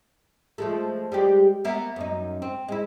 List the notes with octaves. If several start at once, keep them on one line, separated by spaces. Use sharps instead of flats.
F3 G#3 A3
G3 G#3 G4
A#3 B3 E5
F#2 D#4
C4
G#3 E4